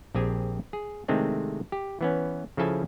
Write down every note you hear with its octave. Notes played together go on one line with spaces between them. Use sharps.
A#1 C4 G4 G#4 G#5
G#4
C3 D#3 G#3 A3 C4 D4
G4
E3 B3 C#4
C#3 F3 E4 A4 G#5 A5